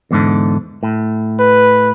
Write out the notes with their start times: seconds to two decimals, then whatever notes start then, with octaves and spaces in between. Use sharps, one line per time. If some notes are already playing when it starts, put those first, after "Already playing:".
0.11 E2 G#2 D3
0.83 A2
1.39 B4